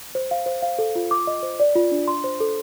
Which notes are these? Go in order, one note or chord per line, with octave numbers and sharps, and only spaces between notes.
C5
F5
C5
F5
A4
F4
D6
D#5
C5
D5
F4
D4
C6
C5
A4